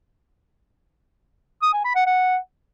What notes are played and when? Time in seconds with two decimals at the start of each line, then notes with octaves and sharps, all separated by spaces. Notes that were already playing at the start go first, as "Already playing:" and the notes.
1.62 D#6
1.73 G#5
1.84 B5
1.95 F#5
2.06 F#5